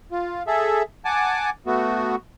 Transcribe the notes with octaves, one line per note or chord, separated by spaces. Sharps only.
F4
G#4 A4 E5
F#5 G#5 A5 D6
A3 B3 F#4